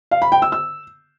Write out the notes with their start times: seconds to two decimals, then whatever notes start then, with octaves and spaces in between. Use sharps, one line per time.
0.11 F5
0.22 B5
0.32 G5
0.42 E6
0.52 E6